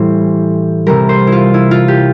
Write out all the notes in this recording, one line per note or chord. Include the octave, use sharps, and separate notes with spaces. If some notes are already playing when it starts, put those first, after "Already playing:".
Already playing: A2 E3 G3 C5
C3 E3 G3 A#4
C5
E4
F4
E4
F4
G4